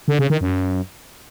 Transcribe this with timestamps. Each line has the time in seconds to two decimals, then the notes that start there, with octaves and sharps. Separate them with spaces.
0.08 D3
0.19 C#3
0.30 D#3
0.41 F#2